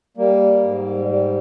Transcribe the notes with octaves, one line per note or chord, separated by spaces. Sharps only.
G3 A#3
G#2
G3